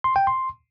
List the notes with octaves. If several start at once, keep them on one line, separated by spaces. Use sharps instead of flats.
C6
G5
C6